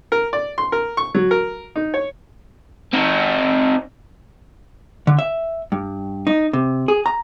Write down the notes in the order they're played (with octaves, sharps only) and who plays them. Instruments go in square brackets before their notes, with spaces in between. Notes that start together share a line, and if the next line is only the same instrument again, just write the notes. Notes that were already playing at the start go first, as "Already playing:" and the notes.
[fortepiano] A#4
D5
C6
A#4
C#6
F#3
A#4
D#4
C#5
[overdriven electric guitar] C4 D#4
[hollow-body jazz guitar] D3
E5
G2
D#4
C3
G#4
A#5